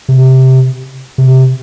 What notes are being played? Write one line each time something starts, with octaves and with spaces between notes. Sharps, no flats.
C3
C3